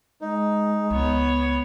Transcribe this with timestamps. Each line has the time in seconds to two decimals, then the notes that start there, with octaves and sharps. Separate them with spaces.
0.21 G#3 D#4
0.90 C#2 B3 C#5